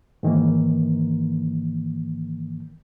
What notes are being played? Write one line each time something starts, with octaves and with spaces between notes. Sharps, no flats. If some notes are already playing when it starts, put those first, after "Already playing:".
G#2 D#3 E3 A#3